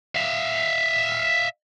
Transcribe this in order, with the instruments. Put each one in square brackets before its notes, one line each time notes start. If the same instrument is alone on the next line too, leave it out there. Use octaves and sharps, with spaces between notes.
[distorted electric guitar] E5 F5